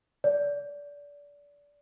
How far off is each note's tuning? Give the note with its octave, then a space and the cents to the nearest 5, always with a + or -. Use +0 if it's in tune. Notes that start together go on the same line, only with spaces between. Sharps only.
D5 -25